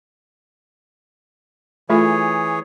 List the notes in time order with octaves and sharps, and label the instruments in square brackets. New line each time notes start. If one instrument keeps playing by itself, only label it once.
[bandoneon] E3 G#4 C#5 [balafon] A3 F4 A4